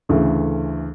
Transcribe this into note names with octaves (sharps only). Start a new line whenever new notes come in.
D2 C#3 E3 A3